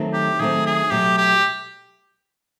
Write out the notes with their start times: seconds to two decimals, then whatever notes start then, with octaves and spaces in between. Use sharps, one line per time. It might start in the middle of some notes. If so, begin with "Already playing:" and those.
Already playing: D#3 F#3 A3 C4
0.13 G4
0.40 D#3 F#3 A3 C4 G#4
0.66 G#4
0.91 B2 F#3 A3 G4
1.17 G4